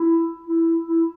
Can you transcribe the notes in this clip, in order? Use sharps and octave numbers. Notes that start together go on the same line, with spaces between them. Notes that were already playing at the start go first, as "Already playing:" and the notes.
Already playing: E4
E4
E4